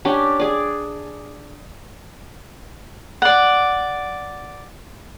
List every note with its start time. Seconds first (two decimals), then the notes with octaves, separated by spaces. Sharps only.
0.05 C#4 D4 G4 D5
0.40 G#4 D5
3.22 D5 F#5